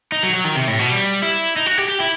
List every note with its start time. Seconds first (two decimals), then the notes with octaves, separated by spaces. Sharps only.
0.12 D#4
0.23 F#3
0.34 F#3
0.44 D#3
0.55 C3
0.68 A2
0.79 B2
0.89 G3
1.22 E4
1.56 D#4
1.66 F#4
1.78 G4
1.88 G4
2.00 E4